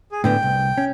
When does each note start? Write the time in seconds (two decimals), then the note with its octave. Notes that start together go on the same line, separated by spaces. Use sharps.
0.12 G#4
0.24 A2 D3 B3 G5
0.43 C2
0.78 C#4